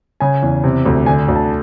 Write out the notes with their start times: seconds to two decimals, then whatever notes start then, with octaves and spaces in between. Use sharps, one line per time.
0.20 C#3 G#5
0.43 E2
0.64 C3
0.86 D2
1.06 D3 G#5
1.28 D2
1.36 A5